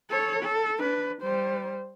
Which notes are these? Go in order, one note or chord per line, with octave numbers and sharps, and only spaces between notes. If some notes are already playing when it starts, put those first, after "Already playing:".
A4 C#5
A4
D4 B4
G3 C5